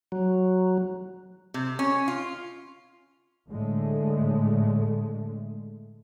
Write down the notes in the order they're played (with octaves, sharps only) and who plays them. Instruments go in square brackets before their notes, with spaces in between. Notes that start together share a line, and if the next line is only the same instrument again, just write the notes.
[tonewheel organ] F#3
[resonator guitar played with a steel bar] C3
C#4
F4
[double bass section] A2 D3 G#3 A3